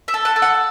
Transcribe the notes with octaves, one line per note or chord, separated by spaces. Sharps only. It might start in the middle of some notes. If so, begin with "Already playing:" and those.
E5
A4
F#5
A4
F#5